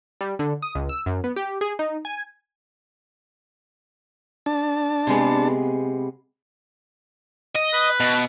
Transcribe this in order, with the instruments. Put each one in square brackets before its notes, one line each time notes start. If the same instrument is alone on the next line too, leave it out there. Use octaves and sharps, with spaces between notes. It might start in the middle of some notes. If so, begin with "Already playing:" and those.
[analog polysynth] G3
D3
D#6
C#2
E6
F#2
B3
G4
G#4
D#4
G#5
[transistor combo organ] D4 A5
[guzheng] C3 G#3 B3
[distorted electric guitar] D#5
[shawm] B4
[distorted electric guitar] B2